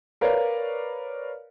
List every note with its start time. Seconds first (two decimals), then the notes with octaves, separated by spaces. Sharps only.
0.21 A#4 B4 C#5 D5 F5